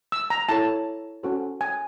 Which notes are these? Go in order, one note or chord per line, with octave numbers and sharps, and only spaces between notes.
E6
A#5
E4 A4 C#5 A5
C#4 F#4 A4 C5
G#5